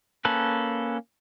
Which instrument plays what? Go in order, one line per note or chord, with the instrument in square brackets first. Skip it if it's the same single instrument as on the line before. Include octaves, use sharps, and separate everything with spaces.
[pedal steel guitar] A#3 C#4 A4 B4